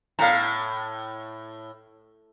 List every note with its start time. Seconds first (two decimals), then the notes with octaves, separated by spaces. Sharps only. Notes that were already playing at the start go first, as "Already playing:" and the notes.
0.19 A2 F5 A#5